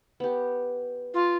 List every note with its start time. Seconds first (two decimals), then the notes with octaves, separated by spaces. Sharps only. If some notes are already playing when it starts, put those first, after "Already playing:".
0.20 B3 G4
1.14 F4